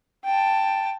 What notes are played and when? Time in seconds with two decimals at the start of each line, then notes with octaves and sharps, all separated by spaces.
0.25 G5 A5